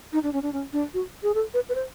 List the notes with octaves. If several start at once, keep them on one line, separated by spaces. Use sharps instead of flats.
D#4
D4
C#4
D4
C#4
D4
F#4
G#4
A4
B4
B4
C5